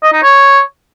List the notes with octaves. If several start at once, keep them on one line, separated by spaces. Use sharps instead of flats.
D#5
D#4
C#5